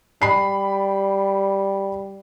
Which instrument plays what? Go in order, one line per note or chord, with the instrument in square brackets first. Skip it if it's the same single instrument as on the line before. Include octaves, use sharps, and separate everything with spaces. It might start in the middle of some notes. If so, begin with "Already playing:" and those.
[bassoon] G3 [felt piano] B5 C7